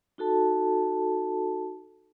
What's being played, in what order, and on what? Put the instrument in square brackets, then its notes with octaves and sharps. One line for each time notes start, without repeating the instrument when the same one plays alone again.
[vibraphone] D#4 F#4 A4 A5